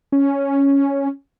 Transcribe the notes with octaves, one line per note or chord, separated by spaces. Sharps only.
C#4